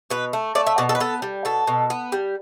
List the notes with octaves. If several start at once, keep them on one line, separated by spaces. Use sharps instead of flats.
B2 B4
A3
A3 D5
E5
B2 D5
A4
B4
B3 A4
G3
B2 A4
B2
B3
G3